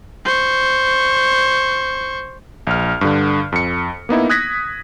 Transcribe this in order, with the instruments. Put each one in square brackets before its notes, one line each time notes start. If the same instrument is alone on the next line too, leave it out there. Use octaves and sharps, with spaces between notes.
[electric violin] C5 C#6
[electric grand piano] A#1 F6
G2 D3
F2 C#7
A#3 B3 D#4 E4
D#6 F#6 G#6 A#6 B6